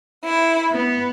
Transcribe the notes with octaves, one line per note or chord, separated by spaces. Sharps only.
E4
B3